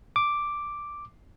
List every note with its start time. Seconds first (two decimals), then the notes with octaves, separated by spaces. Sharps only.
0.16 D6